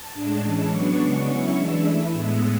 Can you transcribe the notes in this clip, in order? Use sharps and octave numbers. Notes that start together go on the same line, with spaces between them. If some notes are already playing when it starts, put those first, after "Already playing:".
Already playing: A5
A2 G#3 D4
E3 G#3 C#4
F#3 B3 D4 C#6
C#3 G#3 B3 D4
F#3 C#4 E4 C#6
E3 G#3 D4 E6
E3 A3 E4
A2 G#3 B3